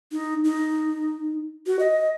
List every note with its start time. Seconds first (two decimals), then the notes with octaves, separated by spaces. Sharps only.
0.12 D#4
0.44 D#4
1.67 F#4
1.79 D#5